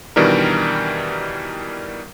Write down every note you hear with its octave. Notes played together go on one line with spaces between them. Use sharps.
B2 D#3 E3 G3 D4 A#4